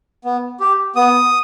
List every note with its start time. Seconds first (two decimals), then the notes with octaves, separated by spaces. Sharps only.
0.24 B3
0.60 G4
0.96 B3 D#6